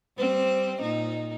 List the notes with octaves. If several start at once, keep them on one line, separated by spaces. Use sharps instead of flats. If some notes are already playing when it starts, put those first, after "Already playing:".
G3 C4 C5
A#2 D#4